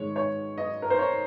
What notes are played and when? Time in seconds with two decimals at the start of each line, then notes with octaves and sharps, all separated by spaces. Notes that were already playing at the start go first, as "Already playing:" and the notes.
Already playing: G#2 D#3 G#3 C#5
0.16 C#5
0.58 D#5
0.82 A#4
0.90 C5
0.99 C#5